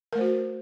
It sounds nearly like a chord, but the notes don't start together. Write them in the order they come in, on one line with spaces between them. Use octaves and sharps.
A#4 A3 C5 F#4